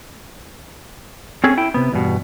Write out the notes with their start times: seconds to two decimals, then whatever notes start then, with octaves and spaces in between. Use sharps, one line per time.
1.44 C4 C#4 G#4 A4
1.57 E4 G5
1.74 C3 B3
1.92 E2 G2 B2